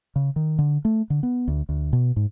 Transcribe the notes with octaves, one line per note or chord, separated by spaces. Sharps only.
C#3
D#3
D3
A3
D3
B3
D2
D2
B2
G#2